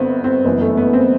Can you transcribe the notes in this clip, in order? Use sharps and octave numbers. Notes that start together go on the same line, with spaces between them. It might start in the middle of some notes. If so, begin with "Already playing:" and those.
Already playing: G1 G2 B3 C4
C4
F#1 F#2 E3 B3
A3
B3
C4